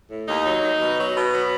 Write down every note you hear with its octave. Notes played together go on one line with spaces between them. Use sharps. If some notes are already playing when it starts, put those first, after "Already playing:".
A2
D#2 D#4
F#3
D#3
B2
F#3
B2
F#3 B3